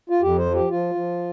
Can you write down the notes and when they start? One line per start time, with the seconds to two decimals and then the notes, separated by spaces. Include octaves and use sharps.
0.10 F4
0.22 F2 G4
0.38 C5
0.46 F3
0.54 G4
0.70 F3 F4
0.95 F3